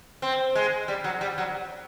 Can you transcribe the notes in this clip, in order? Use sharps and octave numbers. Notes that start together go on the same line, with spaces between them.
C4
G#3
G3
F#3
G3
F#3